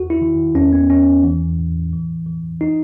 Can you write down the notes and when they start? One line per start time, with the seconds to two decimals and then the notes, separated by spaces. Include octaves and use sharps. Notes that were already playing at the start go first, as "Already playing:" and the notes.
Already playing: E2 F#4
0.10 E4
0.21 D#3
0.55 E2 C#4
0.73 B3
0.90 E2 C#4
1.24 E3
1.59 A2
1.93 E3
2.26 E3
2.61 D#4